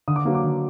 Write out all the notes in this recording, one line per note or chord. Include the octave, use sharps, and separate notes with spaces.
D3 D#6
D6
F#3 A#3
D6
D3